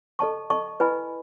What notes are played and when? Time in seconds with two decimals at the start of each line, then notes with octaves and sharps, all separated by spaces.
0.19 A4 D#5 A5 C#6
0.50 A4 D#5 A5 C#6
0.80 E4 B4 D#5 G#5 B5